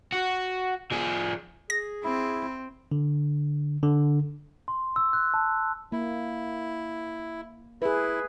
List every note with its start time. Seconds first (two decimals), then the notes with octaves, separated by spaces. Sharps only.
0.12 F#4
0.91 F3 G#4
1.70 G#4 A#6
2.04 C4 E4
2.92 D3
3.83 D3
4.68 C6
4.96 E6
5.13 F#6
5.34 A5
5.92 A#3 E4
7.82 E4 G#4 B4